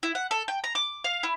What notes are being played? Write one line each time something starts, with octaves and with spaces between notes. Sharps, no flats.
E4
F#5
A4
G5
A#5
D6
F5
E4